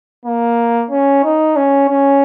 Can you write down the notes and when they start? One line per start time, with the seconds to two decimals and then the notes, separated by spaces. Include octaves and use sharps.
0.25 A#3
0.91 C#4
1.24 D#4
1.56 C#4
1.89 C#4